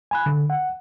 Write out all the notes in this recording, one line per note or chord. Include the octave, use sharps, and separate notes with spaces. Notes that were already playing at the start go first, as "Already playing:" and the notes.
G#5 B5 F#6
D3
F#5